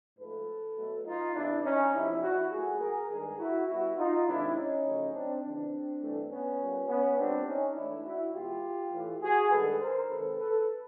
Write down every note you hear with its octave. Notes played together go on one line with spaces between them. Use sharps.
G#2 F3 A3 A4 B4
B2 F#3 A3
D#4 F4
E2 C3 E3 D4 E4
C#4 D#4
E2 C3 F3 D4 E4
E4 F#4
A#2 F#3 A3 F#4 G#4
G#4 A#4
G2 D#3 G#3 G#4 A#4
E4 F#4
B2 G3 E4 F#4
D#4 F4
C3 D#3 G#3 D4 E4
C#4 D#4
F#2 C#3 F3 A3
C4 D4
E2 C#3 E3 C4 D4
G2 E3 A3
B3 C#4
A#2 G3
B3 C#4
A#2 G3 C4 D4
C#4 D#4
G#2 E3 A3 D4 E4
E4 F#4
E2 B2 G#3 F4 G4
A2 E3 A3
F#4 G#4
G2 D#3 G#3 A4 B4
A#4 C5
C3 D#3 G#3 A4 B4
A4 B4